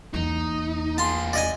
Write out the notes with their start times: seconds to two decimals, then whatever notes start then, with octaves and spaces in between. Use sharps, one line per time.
0.14 E2 A#3 D#4
0.98 F4 G#4 A5 C6
1.33 D5 D#5 G#5